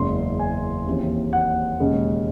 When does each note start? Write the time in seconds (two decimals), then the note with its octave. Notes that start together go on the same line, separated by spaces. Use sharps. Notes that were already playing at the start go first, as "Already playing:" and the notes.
Already playing: F#1 E2 C#3 G#3 C6
0.39 G#5
0.87 D#2 C#3 E3 C4
1.33 F#5
1.80 E1 D#2 C#3 G#3 C#4